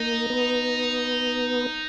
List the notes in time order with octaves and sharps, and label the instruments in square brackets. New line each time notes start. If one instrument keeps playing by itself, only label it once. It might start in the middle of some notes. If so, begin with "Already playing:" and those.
Already playing: [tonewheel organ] A#3 [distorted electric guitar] D#4
[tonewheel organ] B3